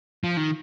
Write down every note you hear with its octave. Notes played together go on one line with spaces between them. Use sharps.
F3
D#3